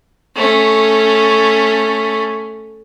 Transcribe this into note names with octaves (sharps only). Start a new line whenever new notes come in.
A3 C#4